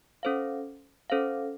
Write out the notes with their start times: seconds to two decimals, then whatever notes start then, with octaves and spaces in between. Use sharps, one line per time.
0.23 C#4 A4 C5 F5
1.10 C#4 A4 C5 F5